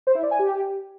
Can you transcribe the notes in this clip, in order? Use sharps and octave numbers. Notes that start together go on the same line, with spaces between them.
C5
E4
D5
G#5
G4